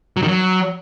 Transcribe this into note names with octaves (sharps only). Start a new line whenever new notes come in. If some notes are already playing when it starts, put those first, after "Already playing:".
F#3
D#3
F#3